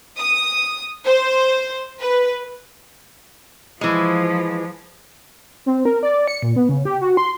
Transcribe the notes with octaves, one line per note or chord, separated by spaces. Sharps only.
D#6
C5
B4
E3 F3 G#3
C4
A#4
D5
C#7
A#2
B3
C#3
G4
F#4
C6